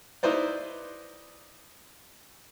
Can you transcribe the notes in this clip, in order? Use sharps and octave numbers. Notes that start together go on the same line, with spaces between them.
D#4 E4 B4 C5 D5